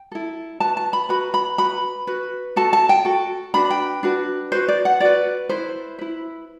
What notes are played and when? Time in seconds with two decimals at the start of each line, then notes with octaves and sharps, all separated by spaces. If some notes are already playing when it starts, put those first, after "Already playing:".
Already playing: G5
0.12 E4 A4
0.60 F#4 B4 A5
0.77 A5
0.93 B5
1.09 F#4 B4 B5
1.34 B5
1.58 F#4 B4 B5
2.07 F#4 B4
2.56 F#4 A4 A5
2.73 A5
2.89 G5
3.05 F#4 A4
3.54 D4 F#4 B4 B5
3.70 G5
4.03 D4 F#4 B4
4.52 F#4 B4 C5
4.68 D5
4.85 F#5
5.00 F#4 B4 D5
5.49 E4 B4 C5
5.99 E4 B4